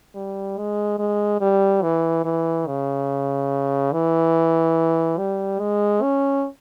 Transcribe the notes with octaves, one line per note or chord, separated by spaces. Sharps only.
G3
G#3
G#3
G3
E3
E3
C#3
E3
G3
G#3
C#4